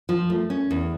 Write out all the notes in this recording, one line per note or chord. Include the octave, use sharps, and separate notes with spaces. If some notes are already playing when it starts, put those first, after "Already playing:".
F3
A3
C#4
E2